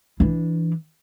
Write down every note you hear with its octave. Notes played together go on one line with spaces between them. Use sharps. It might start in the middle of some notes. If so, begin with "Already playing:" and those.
E3 D4